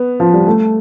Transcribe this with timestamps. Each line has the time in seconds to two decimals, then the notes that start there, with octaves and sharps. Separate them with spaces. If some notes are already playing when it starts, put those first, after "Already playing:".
Already playing: B3
0.20 F3
0.34 G3
0.47 A3